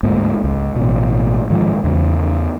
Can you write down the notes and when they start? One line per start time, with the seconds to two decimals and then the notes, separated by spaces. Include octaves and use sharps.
0.03 D2 G#2 A#3
0.44 C#2
0.76 A1 B2
1.50 G#2 D#3 F3
1.84 E2 C#3